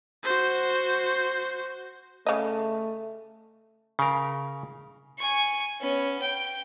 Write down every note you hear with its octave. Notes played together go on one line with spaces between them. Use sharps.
F#4 C5
C#3 A3 D#5
C#3 A#4
G#5 C#6
B3 C#4
G5